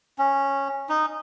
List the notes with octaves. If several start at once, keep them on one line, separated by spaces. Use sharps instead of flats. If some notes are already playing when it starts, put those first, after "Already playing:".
C#4
D#4